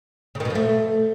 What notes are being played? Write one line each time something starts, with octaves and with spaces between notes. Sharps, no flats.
C#3
D#3
B2
F3
A3